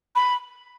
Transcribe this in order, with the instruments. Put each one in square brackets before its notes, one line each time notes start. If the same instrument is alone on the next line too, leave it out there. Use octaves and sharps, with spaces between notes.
[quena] B5